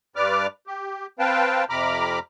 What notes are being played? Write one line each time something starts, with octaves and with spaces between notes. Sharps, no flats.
G2 B4 D5 D6 F6
G4
C4 B4 F5 G5 A5
F2 C3 A#5 B5 D6 F6